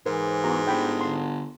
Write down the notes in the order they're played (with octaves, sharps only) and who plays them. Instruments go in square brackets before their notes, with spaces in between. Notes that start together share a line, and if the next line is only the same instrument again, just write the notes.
[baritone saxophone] G#2 [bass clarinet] E3 [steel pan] A#4 C5
[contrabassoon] E2 [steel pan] F#4 A#5
[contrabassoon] G1 [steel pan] G5 B5
[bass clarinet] D3 [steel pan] C6